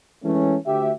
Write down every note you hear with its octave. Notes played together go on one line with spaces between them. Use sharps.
E3 G#3 A3 C#4
D2 G4 E5